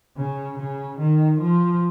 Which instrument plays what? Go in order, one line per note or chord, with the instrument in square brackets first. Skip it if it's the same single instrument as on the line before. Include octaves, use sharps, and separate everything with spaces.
[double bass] C#3
C#3
D#3
F3